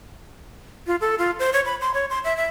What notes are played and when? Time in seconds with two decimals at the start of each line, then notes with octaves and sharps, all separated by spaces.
0.87 F4
1.01 A4
1.19 F4
1.39 C5
1.53 C#5
1.66 B5
1.81 C6
1.94 C#5
2.10 C6
2.24 E5
2.37 E5